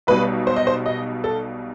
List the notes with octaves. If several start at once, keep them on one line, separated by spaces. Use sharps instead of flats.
B1 B2 G3 B4
C5
D#5
C5
D#5
A4